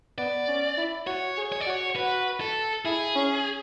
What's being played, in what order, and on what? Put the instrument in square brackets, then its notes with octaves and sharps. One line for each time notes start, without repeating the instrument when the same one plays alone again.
[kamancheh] B3 [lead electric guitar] D5
[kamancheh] C#4
E4
[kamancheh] F#4 [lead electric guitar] C#5
[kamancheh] G#4
[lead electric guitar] C#5
D5
[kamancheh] F#4 [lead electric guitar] C#5
[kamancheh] F#4 [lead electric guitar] B4
[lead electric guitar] A4
[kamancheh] E4 [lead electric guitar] G#4
[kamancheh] C#4